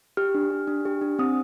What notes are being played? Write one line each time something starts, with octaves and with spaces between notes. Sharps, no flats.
G4 F6
D4
G4
D4
G4
D4
C4 D#6